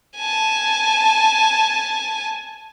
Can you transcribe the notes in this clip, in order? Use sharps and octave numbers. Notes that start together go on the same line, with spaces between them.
G#5 A5